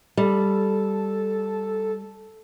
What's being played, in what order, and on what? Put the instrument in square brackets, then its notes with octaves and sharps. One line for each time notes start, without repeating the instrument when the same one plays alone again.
[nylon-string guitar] G3 [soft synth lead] A4